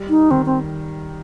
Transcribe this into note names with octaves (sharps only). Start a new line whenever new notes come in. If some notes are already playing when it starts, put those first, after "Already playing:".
Already playing: G3
D#4
D#3 C4
C4